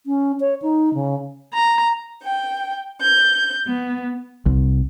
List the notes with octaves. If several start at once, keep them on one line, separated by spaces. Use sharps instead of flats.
C#4
C#5
D#4
C#3
A#5
G5
G6
B3
C2